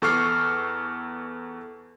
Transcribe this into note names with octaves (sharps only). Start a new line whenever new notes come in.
E2 A4 C#6 D6 F6 C7